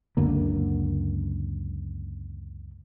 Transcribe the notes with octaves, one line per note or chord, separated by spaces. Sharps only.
C#2 F#2 D3 A#3